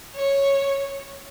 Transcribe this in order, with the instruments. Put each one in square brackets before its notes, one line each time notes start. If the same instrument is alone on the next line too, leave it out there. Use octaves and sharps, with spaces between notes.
[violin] C#5